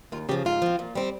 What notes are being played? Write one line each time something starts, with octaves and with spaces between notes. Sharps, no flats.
D#2 F4
C#3 F3 G4
G#2 F4
F3 C4
A#2
G3 C4